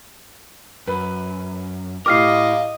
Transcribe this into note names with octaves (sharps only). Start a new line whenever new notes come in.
F#2 B4
A2 G4 A#4 D#5 F5 D6 F6 C7